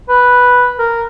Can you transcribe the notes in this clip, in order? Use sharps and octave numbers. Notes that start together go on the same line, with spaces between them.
B4
A#4